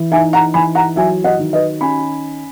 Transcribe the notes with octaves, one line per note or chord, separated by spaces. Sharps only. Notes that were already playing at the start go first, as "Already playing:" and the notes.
Already playing: E3
D#4 E5 G#5
F#5 A#5
E3 G#5 B5
F#5 A#5
F#3 E5 G#5
D#5 F#5
D#3
B4 D#5
C#4 G#5 B5